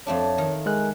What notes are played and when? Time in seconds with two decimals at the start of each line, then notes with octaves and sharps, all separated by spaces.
0.07 F2 A3 D4 C#5
0.38 D#3
0.66 G#3 A#4 G#5 F#6